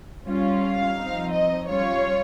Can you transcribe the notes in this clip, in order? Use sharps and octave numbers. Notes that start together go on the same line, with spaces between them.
G3 C#4 F4
F5
F3 C4 D#4
D#5
G3 C#4 F4 C#5